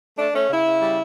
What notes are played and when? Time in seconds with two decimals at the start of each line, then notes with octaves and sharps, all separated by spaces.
0.18 A3 D4
0.34 A3 C#4
0.50 C#3 E4
0.66 C#3
0.82 G3